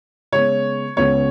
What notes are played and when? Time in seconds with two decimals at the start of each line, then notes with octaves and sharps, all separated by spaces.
0.32 C#3 G#3 B3 C#5
0.96 C#2 C#3 G#3 B3 C#5